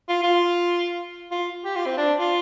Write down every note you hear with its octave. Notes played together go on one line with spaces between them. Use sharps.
F4
F4
F4
G4
F4
C4
D4
F4